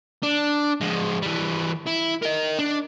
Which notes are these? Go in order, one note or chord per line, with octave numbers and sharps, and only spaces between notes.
D4
F3 G#3
E3 G3
E4
A#4 D#5
D4